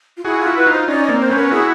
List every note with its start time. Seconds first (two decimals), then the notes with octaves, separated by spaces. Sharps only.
0.17 F4
0.25 E4 F#4 G#4
0.40 F4
0.46 E4 F#4
0.56 B4
0.66 D#4 F4
0.72 C5
0.88 C#4 D#4 D5
1.04 A#3 C4 D5
1.19 C5
1.30 B3 C#4
1.36 A#4
1.51 E4 F#4 G#4